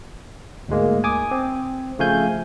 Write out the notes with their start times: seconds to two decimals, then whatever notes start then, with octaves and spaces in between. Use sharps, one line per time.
0.68 D2 G#2 G#3 A#3
1.04 G#5 D6 D#6
1.31 C4
1.99 C#3 F3 A3 F5 G#5 G6